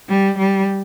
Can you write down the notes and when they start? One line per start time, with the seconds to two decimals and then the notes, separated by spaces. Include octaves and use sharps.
0.09 G3
0.38 G3